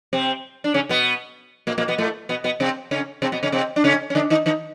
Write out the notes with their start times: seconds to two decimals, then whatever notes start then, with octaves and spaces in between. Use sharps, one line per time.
0.13 C3 C4
0.64 D4
0.74 C#3 C#4
0.89 B2 B3
1.67 A#2 A#3
1.78 A#2 A#3
1.88 B2 B3
1.98 A2 A3
2.29 B2 B3
2.44 B2 B3
2.60 C3 C4
2.91 C#3 C#4
3.22 C3 C4
3.32 B2 B3
3.43 C#3 C#4
3.52 C3 C4
3.76 D4
3.84 C#3 C#4
4.10 C#4
4.15 D3 D4
4.30 D#3 D#4
4.46 D#3 D#4